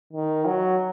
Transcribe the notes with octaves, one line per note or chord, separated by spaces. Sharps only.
D#3
F#3